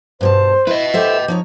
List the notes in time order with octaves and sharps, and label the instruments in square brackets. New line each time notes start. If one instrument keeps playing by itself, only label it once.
[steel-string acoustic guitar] G2 B2 A5 [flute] C5
[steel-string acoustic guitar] E4 [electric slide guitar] B4 D#5
[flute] G4 [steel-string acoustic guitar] A4 C5 E5
[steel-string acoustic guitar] F3 D#4 C#5